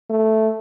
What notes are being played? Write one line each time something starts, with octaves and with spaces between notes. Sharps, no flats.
A3